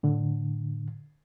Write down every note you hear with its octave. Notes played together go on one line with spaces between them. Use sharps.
A2 D3